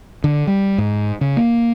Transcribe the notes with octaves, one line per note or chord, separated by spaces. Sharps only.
D3
G3
G#2
C#3
A#3